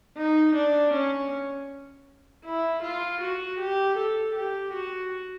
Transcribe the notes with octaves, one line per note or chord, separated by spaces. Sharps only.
D#4
D4
C#4
E4
F4
F#4
G4
A4
G4
F#4